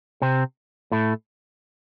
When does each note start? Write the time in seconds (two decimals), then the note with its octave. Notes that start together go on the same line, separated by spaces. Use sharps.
0.22 C3 C4
0.92 A2 A3